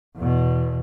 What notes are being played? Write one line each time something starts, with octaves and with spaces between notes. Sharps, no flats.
E2 B2